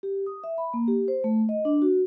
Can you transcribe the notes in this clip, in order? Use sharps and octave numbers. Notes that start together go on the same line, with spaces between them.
G4
D#6
E5
B5
A#3
G4
C5
A3
D#5
D4
F#4